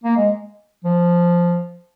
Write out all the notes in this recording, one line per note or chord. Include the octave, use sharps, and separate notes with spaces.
A#3
G#3
F3